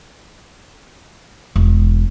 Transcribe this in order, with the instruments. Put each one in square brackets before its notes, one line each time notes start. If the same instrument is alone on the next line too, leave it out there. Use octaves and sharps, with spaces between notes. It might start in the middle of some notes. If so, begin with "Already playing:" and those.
[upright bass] E1